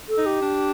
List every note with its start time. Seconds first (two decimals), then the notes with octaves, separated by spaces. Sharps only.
0.09 A4
0.17 D#4
0.26 G4
0.42 D4